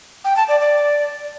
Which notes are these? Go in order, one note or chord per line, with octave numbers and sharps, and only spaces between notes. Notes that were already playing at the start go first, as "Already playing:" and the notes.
G5
A5
D5
D5